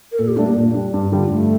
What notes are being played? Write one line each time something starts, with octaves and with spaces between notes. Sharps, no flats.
A#4
A#2 A4
G4
G3 A3 D4
A#3
A#2
G3 D4
G2
D3 G3 D4 F4
G2 A3